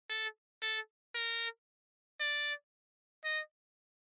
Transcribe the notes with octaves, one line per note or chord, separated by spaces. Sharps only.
A4
A4
A#4
D5
D#5